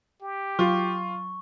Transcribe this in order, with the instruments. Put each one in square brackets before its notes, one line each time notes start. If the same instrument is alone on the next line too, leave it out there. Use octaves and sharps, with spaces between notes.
[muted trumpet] G4
[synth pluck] F#3 [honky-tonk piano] F4 [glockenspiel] C#6